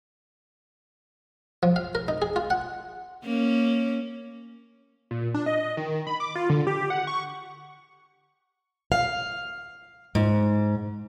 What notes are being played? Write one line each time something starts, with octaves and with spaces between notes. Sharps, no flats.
F3
F5
A#4
D#4
G#4
F4
F#5
A#3 C#4
A#2
D4
D#5
D#3
B5
D6
F4
D3
G4
F#5
C#6
F5
G#2